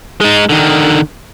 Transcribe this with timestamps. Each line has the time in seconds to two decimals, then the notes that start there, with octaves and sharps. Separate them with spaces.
0.21 G#3 D#4
0.49 D3 D#3